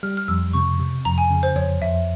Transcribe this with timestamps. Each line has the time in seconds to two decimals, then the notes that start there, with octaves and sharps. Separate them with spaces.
0.03 G3 F6
0.17 F6
0.28 F2 E6
0.53 C3 C#6
0.79 C3
1.05 F2 A#5
1.18 G#5
1.30 C#3
1.43 C5
1.56 F2 C#5
1.81 F2 E5